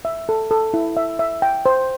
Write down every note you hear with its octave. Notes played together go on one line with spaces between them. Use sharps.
E5
A4
A4
E4
E5
E5
G5
C5